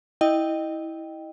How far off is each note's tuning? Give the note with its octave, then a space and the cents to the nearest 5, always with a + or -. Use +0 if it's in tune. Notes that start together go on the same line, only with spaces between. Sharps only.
E4 -20 D#5 -15 G5 +0